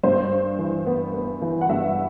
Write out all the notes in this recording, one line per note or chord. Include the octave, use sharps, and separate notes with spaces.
G2 C5
D4
E3
B3
B3
E3
F#5
G2 E5